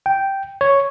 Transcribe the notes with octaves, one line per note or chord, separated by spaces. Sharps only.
G5
C#5